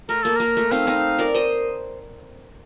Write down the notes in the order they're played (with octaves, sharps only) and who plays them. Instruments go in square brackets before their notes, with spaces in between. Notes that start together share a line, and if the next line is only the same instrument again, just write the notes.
[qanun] A3 [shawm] A#4
[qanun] A#3 [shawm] A4
[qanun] A#3 [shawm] A#4
[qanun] A3
[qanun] C4 D#4 [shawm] F5
[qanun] C4 D#4
A#4 D5
C5 D#5